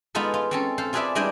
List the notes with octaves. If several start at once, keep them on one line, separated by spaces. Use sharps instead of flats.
G#3 B3 D#4 F4 G#4 A4
F4
C4 C#4 A4
A4 C5 F5
F4 G#4 A4 B4 D5 E5
G3 G#3 D4 E4 D#5 G5